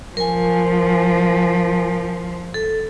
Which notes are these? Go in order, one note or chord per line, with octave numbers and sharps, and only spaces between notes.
F3 A#4 G#5
A4